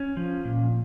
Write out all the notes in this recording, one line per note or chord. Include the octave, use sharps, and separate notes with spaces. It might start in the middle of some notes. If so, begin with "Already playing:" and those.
Already playing: C#4
F3
A#2